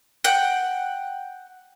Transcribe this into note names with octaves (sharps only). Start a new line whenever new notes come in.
F#5 G5